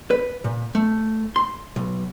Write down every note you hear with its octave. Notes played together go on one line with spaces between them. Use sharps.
B4
A#2
A3
C6
B1